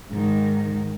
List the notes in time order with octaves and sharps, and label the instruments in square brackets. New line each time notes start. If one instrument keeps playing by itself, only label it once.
[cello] G#2 D#3